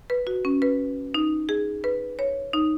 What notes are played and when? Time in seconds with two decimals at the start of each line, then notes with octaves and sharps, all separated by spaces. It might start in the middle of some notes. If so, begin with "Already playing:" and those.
0.10 B4
0.27 F#4
0.45 C#4
0.62 B4
1.14 D#4
1.49 G#4
1.84 B4
2.19 C#5
2.53 D#4